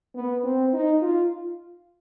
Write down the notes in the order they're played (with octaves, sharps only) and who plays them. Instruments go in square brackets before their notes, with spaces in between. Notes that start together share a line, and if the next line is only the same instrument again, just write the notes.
[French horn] B3
C4
D#4
F4